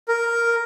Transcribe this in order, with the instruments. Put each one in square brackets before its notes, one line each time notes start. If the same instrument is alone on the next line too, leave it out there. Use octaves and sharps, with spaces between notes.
[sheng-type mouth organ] A#4